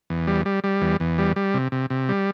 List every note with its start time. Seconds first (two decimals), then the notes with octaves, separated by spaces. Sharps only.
0.10 E2
0.27 G3
0.45 G3
0.64 G3
0.82 E2
1.00 E2
1.18 G3
1.36 G3
1.54 C3
1.72 C3
1.90 C3
2.09 G3